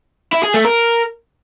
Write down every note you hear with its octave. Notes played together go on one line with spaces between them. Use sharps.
E4
G#4
A3
A#4